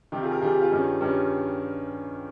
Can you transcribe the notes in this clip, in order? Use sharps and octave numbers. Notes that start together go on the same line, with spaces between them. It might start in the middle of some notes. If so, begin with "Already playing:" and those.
C3 D#3 G3 G4
F4 G#4
G4 A#4
C3 D#3 G3 F4 G#4
G4
F4 G#4
G2 D#3 G3 C#4
G2 D#3 G3 C#4